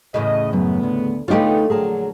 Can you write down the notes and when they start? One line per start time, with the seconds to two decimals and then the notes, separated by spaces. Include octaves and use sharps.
0.14 E2 A2 C#3 D#5
0.53 F#2 B3
0.83 D2
1.28 D3 G#3 A3 B3 D#4 F4 G4 C#5
1.70 A#1 D3 F#3 G#4 A#4 A5